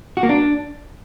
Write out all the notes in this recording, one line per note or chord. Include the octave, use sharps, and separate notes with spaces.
F#4
A#3
D4